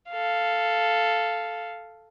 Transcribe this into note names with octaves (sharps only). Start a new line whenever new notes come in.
A4 F5